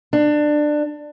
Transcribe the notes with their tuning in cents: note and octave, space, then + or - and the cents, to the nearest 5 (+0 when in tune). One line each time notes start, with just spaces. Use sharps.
D4 +20